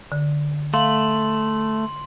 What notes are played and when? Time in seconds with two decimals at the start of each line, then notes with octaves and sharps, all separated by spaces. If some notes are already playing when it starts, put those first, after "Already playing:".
0.12 D3
0.74 A3 F5 C6 F#7